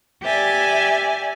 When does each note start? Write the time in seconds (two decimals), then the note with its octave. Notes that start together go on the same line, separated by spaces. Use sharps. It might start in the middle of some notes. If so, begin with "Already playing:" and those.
0.23 G4 D5 E5 G#5